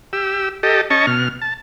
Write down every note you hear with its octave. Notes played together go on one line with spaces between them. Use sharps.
G4 E6
G4 A4 D#5
C#4 D#5 A5 C#6
B2 F6
A5